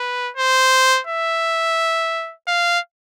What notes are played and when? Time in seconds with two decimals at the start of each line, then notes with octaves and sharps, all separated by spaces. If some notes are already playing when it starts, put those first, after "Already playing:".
Already playing: B4
0.37 C5
1.07 E5
2.47 F5